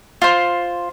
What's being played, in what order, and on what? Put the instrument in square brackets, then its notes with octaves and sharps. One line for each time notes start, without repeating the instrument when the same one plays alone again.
[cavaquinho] F4 C5